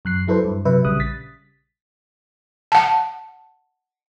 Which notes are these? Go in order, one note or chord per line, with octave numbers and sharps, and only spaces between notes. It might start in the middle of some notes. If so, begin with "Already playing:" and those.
F#2 F#6 C7
F#3 E4 A4 B4 C5
G2
C3 F#3 B4 E5
A#1 C#3 G3 D#6 F#6
A6 B6
F#5 A5